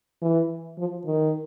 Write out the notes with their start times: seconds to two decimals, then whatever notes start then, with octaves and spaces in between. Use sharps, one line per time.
0.22 E3
0.78 F3
1.05 D#3